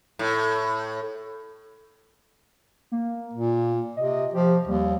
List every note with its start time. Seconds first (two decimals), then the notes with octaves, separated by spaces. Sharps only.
0.19 A2
2.92 A#3
3.34 A#2
3.97 C3 D#5
4.34 F3 G4
4.68 D#2 G3